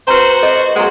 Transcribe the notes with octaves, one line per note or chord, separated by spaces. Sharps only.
F#4 B4 C5 A#5
A4 D#5
F#3 G#3 A#3 F#5 C6